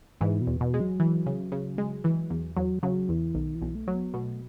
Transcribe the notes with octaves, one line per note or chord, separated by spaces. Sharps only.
G#2 E3
B2
E2
B2
G#3
F#3
E3
C#3
C#3
G#3
E3
E2
E2 F#3
C#3 F#3
E2 E3
B1 D#3
E3
B1
A3
F#3
B3
B2 A3